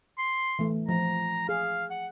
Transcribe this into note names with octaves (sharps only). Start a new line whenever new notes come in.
C6
E3 A3
F3 A#5
G#4 F5
F#5